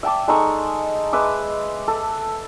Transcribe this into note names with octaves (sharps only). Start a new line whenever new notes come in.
E5 G5 A5 D6
G#3 D#4 A4 C#6
G#3 B4 E5 D6
A4